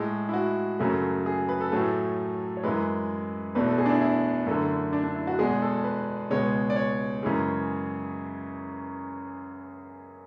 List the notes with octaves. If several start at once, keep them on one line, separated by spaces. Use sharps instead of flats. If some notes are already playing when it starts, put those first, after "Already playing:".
Already playing: A2 G#3 A4
E4
F#4
F#2 C#3 F#3 A3
G#4
B4
A4
A2 F#3 A3 G#4
A4
C#5
F#2 E3 G#3 B4
E2 B2 A3 B4
A4
G#4
D4
E4
E4
F#2 D3 A3
D4
D4
E4
F#4
E2 B2 G#3 G#4
A4
B4
C#2 B2 G#3 C#5
D5
C#5
F#2 C#3 E3 G#3